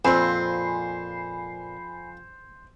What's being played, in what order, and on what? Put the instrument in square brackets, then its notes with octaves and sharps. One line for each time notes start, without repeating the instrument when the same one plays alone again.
[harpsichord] F2 [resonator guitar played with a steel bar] A#2 C4 [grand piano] C5 [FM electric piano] G#5 B5 C7